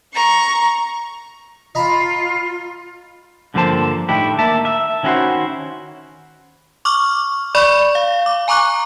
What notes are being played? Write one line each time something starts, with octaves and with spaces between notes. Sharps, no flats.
A#5 C#6
F4 D#5 A#5 B5
G2 D3 F3 A#3 C5 A5
A2 D#3 D4 E4 G4
A#3 E5 A5
E5
D#3 C#4 E4 F#4 C5
C#6 D6 F6
D5 B5 C#6
F5
D6
G#5 A#5 C#6 D6 F#6